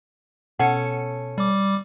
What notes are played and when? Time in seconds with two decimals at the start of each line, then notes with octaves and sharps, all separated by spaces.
0.59 B2 C#4 A4 F#5
1.38 G3 D6